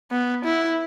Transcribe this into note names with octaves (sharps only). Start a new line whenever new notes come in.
B3
E4